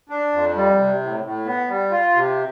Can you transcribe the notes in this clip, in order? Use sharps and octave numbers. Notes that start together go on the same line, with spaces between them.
D4
F2
G3
C3
A2
A2
B3
G3
F4
C3